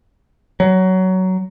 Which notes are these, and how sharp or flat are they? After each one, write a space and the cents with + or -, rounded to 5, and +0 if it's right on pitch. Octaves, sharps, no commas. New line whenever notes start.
F#3 +15